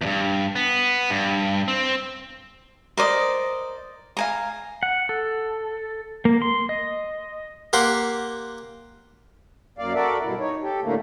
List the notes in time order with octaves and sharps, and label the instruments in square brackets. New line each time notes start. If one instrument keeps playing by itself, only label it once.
[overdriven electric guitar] E2 G2
B3
G2
C4
[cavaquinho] A#4 C5 D5 D#5
F5 G#5 A#5
[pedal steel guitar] F#5
A4
A#3
C6
D#5
[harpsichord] A#3 G4 F#5 C6
[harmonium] F#2 A#3 D5 F5
F#4 A4 A#4 D5 E5
G2 B2 E4
D#4 C#5
G4 A4
A2 D3 A3 A#3